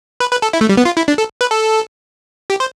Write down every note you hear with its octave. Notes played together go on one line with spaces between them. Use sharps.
B4
B4
A4
E4
A3
G3
B3
F4
E4
D4
A4
B4
A4
G4
C5